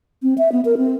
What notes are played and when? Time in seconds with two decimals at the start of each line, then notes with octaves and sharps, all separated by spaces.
0.23 C4
0.38 E5
0.52 B3
0.65 A#4
0.78 C4